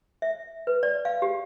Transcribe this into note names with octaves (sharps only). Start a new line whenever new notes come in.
E5
B4
D5
F5
G4